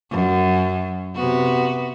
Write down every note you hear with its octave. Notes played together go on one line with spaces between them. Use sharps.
F#2
C3 B3 F#4